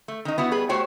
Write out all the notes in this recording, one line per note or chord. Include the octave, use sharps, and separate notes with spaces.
A3
D#3 D#4
B3 E4 F#4
G3 G#4 B4
A3 F#4 G4 C5 C#5 G5